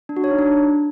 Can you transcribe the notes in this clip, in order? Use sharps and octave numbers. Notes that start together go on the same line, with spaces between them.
D4
F#4
C#5
D#4
D4